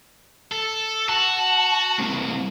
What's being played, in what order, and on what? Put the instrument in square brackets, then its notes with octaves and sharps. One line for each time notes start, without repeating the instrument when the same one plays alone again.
[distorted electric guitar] A4
[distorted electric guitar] F#4 [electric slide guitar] A5
[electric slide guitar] G3 A#3 C4